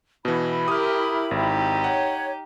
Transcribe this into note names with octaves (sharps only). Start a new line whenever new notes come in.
B2 E3 E4 B5
G4 A#4 D#6 F6
G#1 D#4 G4
C#5 F#5